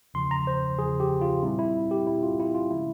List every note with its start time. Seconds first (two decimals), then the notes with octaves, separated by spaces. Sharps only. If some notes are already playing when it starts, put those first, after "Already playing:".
0.14 E2 C#3 F3 C6
0.31 A#5
0.47 C5
0.78 E2 C#3 F3 G#4
1.00 G4
1.21 F4
1.42 A#2 G3 C4 E4
1.59 E4
1.91 G4
2.07 A#2 G3 C4 E4
2.23 F4
2.40 E4
2.55 F4
2.71 C#3 F3 G#3 C#4 E4